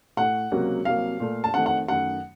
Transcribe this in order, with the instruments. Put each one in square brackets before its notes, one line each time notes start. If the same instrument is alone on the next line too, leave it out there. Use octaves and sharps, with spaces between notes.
[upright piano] A2 A3 F#5
C#2 C3 F#3 A#3
C2 C3 F#3 A#3 F5
A#2 A3
A5
F2 D#3 A3 F#5
F#5
F#2 D#3 A3 F#5